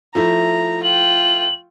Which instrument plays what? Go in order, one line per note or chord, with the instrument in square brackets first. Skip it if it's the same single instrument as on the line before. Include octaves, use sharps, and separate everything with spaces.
[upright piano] F3 A3 E4 [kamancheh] A#5
[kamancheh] F4 G5 [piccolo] F#7